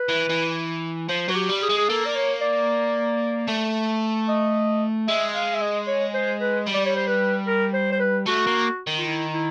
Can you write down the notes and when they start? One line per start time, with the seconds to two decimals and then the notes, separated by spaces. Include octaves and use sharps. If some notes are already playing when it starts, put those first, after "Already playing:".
Already playing: B4
0.09 E3
0.30 E3
1.09 F3 C5
1.28 F#3 F#4
1.36 G4
1.49 G3
1.62 G#4
1.69 G#3
1.78 G#4
1.89 A#3 A4
2.06 D5
2.15 C#5
2.41 D5
3.48 A3
4.28 D#5
5.08 G#3 E5
5.34 F5
5.54 E5
5.61 D#5
5.87 C#5
6.14 C5
6.41 B4
6.67 G3
6.74 D5
6.86 C#5
6.96 C5
7.08 B4
7.47 A#4
7.74 C5
7.92 C5
8.00 B4
8.26 A3 F#4
8.47 A#3
8.87 D#3
8.98 F4
9.06 E4
9.34 E4